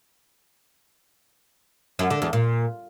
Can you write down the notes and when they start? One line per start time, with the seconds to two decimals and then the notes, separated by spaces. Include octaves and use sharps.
1.99 F#2
2.10 D3
2.22 E2
2.33 A#2